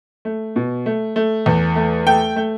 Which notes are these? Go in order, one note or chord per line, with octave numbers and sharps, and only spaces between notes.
A3
B2
A3
A3
E2
A3
A3 G5
A3